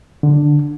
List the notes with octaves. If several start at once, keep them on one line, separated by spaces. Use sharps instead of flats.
D3